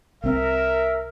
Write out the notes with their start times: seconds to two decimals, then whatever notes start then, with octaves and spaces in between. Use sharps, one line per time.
0.24 C2 C4 A#4 E5